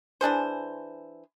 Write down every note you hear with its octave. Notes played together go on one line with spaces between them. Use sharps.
E3 D4 G#4 C5